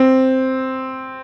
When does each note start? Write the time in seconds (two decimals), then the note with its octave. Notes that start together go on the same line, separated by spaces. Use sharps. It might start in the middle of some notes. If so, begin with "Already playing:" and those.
Already playing: C4